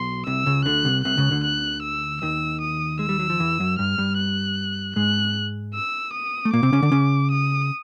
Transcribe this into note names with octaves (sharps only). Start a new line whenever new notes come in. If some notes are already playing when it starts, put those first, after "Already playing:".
Already playing: B1 B2 C6
C2 C3 E6
C#2 C#3
D2 D3 F#6
C2 C3
C2 C3 F#6
C#2 C#3
D2 D3
F#6
E6
D#2 D#3 E6
D#6
G#3 E6
G3
F#3
F3
E2 E3
F#2 F#3
G2 G3 F6
G2 G3
F#6
G#2 G#3 F#6
E6
D#6
A3
A#2 A#3 D6
C3 C4
C#3 C#4
D3 D4
C#3 C#4
D#6